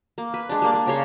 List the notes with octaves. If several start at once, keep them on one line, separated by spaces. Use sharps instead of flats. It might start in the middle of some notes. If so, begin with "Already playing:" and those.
A#3
B4
G#3 D4
G3 A#3 D5
A#3
C#3 A#3 C#5 C6